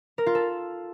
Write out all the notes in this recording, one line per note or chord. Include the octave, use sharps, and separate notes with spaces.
A#4
F4
A4